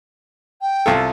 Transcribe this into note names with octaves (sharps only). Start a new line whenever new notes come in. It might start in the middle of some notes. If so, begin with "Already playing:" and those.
G5
C2 F4 A4